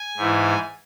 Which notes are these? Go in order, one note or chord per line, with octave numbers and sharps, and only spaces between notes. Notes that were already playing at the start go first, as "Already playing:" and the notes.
Already playing: G#5
G#2 E3